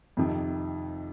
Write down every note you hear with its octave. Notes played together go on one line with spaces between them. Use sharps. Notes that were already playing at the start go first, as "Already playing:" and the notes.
F2 C3 D#3